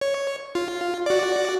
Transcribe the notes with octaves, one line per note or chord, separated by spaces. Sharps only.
C#5
F4
F#4 D5